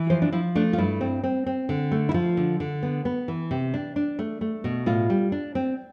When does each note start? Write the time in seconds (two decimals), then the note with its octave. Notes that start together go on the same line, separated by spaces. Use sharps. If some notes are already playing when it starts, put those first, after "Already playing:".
Already playing: E3
0.10 F3 C5
0.22 D4
0.32 F3 E4
0.55 A3 D4
0.73 F4
0.78 G2 E4
1.01 C4
1.23 C4
1.46 C4
1.69 D3
1.91 A3
2.09 E4
2.14 F3 F4
2.37 D3
2.60 D3
2.83 B3
3.05 B3
3.28 E3
3.51 C3
3.74 D4
3.96 D4
4.19 A3
4.41 A3
4.64 B2
4.86 A2 F4
5.10 G3
5.32 D4
5.55 C4